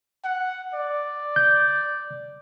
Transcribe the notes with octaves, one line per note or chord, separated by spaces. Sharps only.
F#5
D5
G6